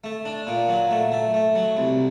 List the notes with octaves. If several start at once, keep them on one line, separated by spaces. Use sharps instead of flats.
A3
D4
A#2
F#3
A3
A3
A3
F#3
C2